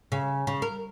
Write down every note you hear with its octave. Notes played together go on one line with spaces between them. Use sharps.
C#3
C#3
A#4